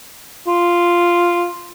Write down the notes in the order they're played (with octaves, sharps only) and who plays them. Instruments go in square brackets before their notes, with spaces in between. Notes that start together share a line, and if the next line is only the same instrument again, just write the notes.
[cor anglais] F4